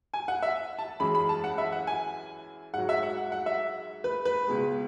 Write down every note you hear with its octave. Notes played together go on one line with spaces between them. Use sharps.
G#5
F#5
E5
A5
F#2 E3 G#3 B5
B5
A5
F#5
E5
F#5
G#5
G#2 F#3 F#5
E5
F#5
F#5
F#5
E5
B4
B4
C#2 B2 G#3